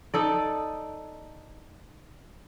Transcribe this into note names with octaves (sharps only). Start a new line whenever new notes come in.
D#4 A4 D5